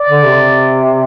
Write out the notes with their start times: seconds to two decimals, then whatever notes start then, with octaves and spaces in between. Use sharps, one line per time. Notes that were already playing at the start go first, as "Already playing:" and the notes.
Already playing: D5
0.09 D3
0.25 C3